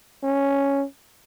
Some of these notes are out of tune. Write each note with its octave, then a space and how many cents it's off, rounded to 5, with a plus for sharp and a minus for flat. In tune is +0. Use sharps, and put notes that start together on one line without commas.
C#4 +0